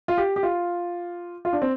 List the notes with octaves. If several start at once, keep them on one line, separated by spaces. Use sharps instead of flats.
F4
G4
G4
F4
F4
D4
C4